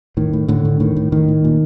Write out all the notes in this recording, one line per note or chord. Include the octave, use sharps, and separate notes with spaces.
A2 D#3
A2
A2 D3
A2
A2 D#3
A2
A2 D#3
A2
A#2